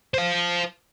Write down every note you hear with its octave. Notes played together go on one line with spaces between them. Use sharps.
C5 F5